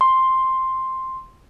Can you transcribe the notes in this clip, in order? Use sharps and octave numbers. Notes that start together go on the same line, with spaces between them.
C6